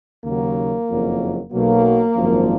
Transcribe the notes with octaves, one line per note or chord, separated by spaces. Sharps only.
D#2 C#3 F#3 A#3
F#1 F2 D#3 F#3
B1 B2 F#3 A#3
G#1 F#2 F3